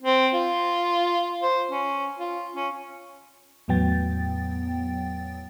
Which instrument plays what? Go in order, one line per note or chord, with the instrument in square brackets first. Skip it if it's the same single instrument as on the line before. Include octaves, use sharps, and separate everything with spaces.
[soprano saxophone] C4
F4
C5
C#4
F4
C#4
[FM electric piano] E2 A2 F#3 B3 G5 A6